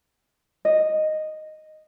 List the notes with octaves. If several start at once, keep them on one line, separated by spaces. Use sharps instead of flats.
D#5